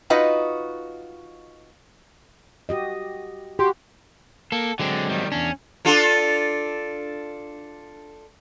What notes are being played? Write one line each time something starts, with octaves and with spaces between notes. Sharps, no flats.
D#4 F4 F#4 B4 D#5
F#4 G4 D#5
F#4 G4 C6
A#3 A4
D3 F#3 G#3 C4
D#3 G3
E2 C#4 D4
D4 F4 A4